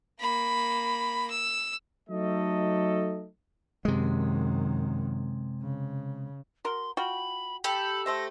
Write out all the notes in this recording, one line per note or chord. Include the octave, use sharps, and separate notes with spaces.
A#3 B5
E6
F#3 A3 D#4 A4 D#5
F#2 C3 D#3 G#3
C#3
F#4 A#4 C6
F4 F#4 G5 B5
G4 A4 B5
A3 C5 E5 A#6